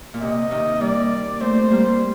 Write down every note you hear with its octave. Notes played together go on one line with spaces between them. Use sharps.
A#2
C3 D#5
C3 D#3
G3 A#3 D5
A3 C4 C5
G3 A#3